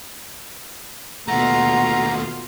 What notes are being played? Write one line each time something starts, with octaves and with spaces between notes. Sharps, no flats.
D#2 B2 A3 F4 F#5 A#5